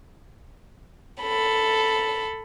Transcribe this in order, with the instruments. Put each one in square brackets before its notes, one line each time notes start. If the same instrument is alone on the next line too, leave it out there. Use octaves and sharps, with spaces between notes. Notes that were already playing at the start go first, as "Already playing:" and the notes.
[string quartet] A4 B5